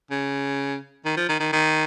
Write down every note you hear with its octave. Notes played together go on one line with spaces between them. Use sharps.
C#3
D#3
F3
D#3
D#3
D#3